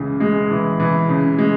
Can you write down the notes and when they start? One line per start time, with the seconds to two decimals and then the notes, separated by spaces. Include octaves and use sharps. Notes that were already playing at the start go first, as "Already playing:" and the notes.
Already playing: C#2 C#3 E3
0.20 G#3
0.50 E3
0.80 E3
1.09 C#3
1.38 G#3